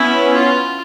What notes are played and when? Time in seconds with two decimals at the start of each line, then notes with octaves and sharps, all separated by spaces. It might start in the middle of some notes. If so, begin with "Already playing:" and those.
Already playing: B3 C#4 E4
0.33 F4